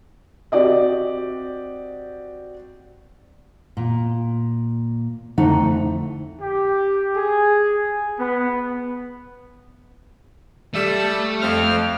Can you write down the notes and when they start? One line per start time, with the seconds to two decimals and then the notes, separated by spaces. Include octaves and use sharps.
0.52 C4 F#4 G4 D5 D#5
3.77 A#2
5.38 F2 D3 A3 D#4 F#5
6.41 G4
7.15 G#4
8.19 B3
10.74 G3 A3 E6
11.41 F2 C4 F6